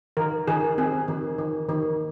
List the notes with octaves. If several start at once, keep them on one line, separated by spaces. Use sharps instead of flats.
D#3 A#4
D#3 G#4
C4 G#4
D#3
D#3
D#3